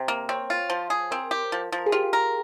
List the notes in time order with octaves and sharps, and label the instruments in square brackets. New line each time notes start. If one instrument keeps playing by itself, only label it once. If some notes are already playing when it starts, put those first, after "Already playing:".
Already playing: [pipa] C3 [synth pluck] C5
[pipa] A#3
[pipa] C4 [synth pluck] C#5
[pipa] F4
[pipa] F3 [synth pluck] C5
[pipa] G#4
[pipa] C4 [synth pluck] A#4
[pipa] G4
F3
F3
[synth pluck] A#4
G#4
[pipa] F4 [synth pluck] G4
[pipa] A#4